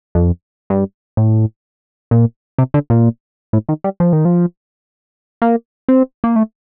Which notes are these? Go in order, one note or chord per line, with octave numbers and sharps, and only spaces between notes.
F2
G2
A2
A#2
C3
D3
A#2
A2
D#3
G3
F3
D#3
F3
A#3
C4
A#3
A3